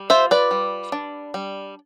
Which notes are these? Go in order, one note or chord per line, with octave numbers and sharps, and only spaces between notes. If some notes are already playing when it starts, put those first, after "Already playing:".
Already playing: G3
F4 C5 E5
B4 D5
G3
D4
G3